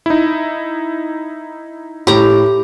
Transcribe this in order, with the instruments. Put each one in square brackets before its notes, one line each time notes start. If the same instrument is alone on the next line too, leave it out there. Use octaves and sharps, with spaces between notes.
[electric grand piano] D#4 E4
[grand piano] A2 [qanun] G4 A#5